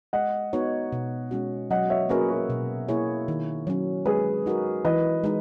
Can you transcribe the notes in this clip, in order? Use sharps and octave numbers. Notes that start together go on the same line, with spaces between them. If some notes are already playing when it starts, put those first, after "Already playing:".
G#3 D#5 F#5
B3 D#4 F#4 C#5
B2
G#3 C#4 F#4
F#3 D#5 F#5
C#5 E5
A#3 C#4 F#4 G#4 A#4 B4
F#4 A#4
B2
A#3 E4 G#4 C#5
D#3
F#3 C#4
G#3 G#4 B4
D#4 F#4 A#4
E3 B4 D#5
G#3 D#4